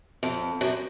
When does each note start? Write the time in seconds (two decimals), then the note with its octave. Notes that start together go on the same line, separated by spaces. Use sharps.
0.23 F2
0.61 F#2